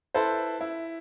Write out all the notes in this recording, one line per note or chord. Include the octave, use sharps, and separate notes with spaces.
E4 A4 B4 C5
E4